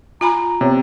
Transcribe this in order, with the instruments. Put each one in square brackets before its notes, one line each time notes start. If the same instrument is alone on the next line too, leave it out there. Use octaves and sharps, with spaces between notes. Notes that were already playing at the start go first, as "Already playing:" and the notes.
[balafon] F4 G#5 B5 [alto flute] A#5
[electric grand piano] C3 [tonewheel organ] B3 C#5